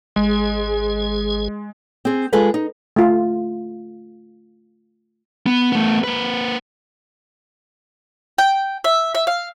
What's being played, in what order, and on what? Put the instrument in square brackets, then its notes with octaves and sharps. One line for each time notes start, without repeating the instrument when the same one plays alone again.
[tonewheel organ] G#1 G#4 [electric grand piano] G#3
[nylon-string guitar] C4 G#4
G#3 F4 G#4 A4 B4
D#4
[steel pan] A3 F4
[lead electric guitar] B3
A3 B3
A#3 B4
[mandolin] G5
E5
E5
F5